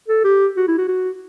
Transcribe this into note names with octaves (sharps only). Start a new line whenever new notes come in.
A4
G4
F#4
E4
F#4
F#4